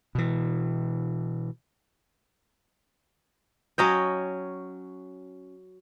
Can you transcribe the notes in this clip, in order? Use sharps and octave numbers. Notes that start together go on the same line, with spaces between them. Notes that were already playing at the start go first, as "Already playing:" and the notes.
B2 E3
F#3 C#4 D#5 G5